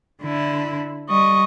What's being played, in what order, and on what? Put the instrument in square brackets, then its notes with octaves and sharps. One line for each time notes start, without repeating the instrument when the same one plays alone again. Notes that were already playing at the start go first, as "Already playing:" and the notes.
[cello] D3 E4
[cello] G3 [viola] D#5 C#6